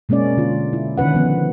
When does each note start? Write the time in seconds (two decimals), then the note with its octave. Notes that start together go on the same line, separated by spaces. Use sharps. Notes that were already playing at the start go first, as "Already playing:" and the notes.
0.09 B2 G#3 A#3 C#4 D5
0.37 D3 F4
0.73 E4
0.98 D3 D#3 C#4 B4 F#5
1.13 D#3 F3 B3